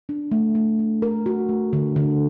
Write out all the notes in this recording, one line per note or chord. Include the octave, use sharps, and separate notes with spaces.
D4
A3
A3
D4
A#4
F#4
A3
D3
D3